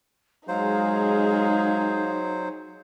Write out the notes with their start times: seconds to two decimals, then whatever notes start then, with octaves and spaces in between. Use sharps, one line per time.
0.48 F#3 G#3 D#4 G#4 C5 F5